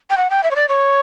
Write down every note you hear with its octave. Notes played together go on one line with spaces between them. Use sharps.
G5
F#5
G5
E5
C#5
D5
C#5